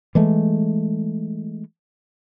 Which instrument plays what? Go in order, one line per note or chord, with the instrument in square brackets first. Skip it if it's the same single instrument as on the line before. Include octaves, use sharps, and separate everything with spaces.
[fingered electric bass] E3 G#3 A3